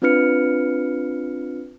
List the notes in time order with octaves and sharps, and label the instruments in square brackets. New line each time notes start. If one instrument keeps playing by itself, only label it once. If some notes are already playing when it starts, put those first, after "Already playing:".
[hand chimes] C4 D4 F4 B4 F6 C#7